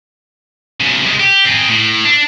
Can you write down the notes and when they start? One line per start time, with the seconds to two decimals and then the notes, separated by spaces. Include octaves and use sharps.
0.80 B1 C#3
1.03 C3 G#3
1.20 G4
1.45 C4 G#4
1.69 A2
2.05 D4